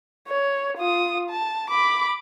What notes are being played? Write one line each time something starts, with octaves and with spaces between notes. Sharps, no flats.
C#5
F4 D#6
A5
B5 D6